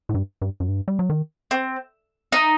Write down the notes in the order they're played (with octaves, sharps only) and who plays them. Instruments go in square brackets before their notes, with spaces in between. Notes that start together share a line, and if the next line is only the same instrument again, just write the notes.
[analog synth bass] A2
G2
G2
F#2
G2
G3
F#3
D#3
[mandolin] C4
D#4